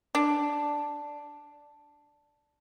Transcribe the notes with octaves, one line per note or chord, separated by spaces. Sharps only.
D4